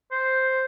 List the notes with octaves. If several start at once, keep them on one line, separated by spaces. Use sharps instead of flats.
C5